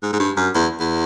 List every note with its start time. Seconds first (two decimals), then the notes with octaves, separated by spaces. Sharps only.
0.03 G#2
0.13 G#2
0.20 G2
0.37 F#2
0.55 E2
0.80 E2